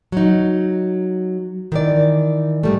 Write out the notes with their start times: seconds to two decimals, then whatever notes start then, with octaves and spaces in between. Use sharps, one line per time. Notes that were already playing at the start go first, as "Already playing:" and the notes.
0.12 F#3 D#4
1.72 D#3 E3 D5
2.63 G#2 G3 A3